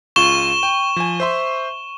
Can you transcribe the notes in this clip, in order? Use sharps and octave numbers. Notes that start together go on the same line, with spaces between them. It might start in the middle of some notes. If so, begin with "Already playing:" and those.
C#2 F4 C#6 E7 G7
G5
F3 G#5
C5 E5 C6